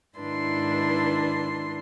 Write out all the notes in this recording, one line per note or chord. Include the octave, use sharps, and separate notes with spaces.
G#2 D#3 D4 E4 B4 C6